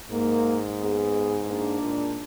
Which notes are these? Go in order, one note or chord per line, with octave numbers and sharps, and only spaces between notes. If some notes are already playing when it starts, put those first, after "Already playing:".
G#2 A#3
B3 G#4
G#3 A#3 D4
A#2